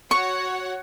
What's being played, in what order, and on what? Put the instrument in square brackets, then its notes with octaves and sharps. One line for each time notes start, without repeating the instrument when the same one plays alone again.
[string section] F#4 C#5 F#5 [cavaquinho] C#6